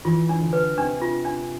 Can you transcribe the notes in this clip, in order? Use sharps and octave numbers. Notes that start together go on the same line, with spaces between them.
E3 F4
D4
D3
B4
C3 D4
F4
D4